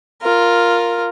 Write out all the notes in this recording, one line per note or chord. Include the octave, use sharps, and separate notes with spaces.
F4 A#4